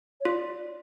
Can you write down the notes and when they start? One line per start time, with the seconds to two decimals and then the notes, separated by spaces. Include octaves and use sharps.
0.21 C#5
0.25 F4 D5